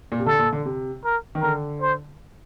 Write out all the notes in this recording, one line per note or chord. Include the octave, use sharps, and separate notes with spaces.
A#2
C3
D3 A4
A#2
D3
C3
A#4
D#3
D3 A#4
C5